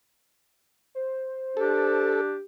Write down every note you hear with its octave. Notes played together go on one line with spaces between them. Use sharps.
C5
D4 G4 A4